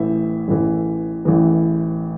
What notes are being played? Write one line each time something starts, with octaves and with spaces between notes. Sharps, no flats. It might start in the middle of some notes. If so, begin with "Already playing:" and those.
Already playing: A1 A2 E3 E5
A1 A2 E3
A1 A2 E3